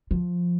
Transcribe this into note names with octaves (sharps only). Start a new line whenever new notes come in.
F3